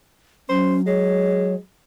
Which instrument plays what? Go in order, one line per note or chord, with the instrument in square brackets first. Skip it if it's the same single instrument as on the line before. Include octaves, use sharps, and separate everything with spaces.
[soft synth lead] F#3 [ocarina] C#4 [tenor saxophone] C5
[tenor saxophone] G#3 [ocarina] C#5